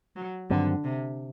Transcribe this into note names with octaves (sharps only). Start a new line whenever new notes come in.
F#3
G2 D3 D#3 F#3 C4
C3